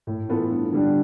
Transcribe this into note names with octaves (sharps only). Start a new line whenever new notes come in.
A2
E3 B3 F4 A4
G2
D3 G3 D4